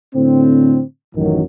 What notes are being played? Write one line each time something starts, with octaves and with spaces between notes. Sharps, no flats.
A2 D3 C4
A1 F#2 D#3 E3 F#3